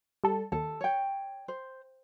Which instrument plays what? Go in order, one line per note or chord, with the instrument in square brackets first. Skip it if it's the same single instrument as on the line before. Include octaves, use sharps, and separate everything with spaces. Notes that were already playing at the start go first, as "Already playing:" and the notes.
[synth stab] G3 A4
[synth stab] D#2 [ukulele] A4
[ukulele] C#5 G5
C5